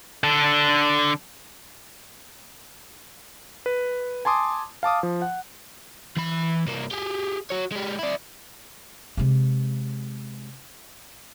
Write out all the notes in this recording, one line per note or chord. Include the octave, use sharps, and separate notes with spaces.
D3 A4
B4
G#5 A5 C6 D6 D#6
F5 A5 D6 D#6
F3
F#5
E3 B5
C2 A#3
G4 G#4
F#4 C#5
G#3 G4
E4 D5
C3 G#3